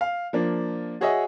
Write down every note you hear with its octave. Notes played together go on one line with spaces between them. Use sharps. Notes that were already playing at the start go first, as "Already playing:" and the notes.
F5
F3 A#3 D4
F#4 G#4 C#5 D#5 E5 F#5